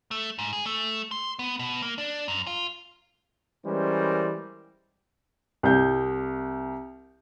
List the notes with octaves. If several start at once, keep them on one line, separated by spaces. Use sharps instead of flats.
A3
G#2
G#4
A3
C6
B3
B2
A#3
D4
F#2
F4
E3 G3 G#3 C#4 A#4 C5
C2 G6